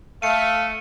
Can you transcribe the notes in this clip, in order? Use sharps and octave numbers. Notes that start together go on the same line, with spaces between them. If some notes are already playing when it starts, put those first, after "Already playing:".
A3 F5 C#7 D#7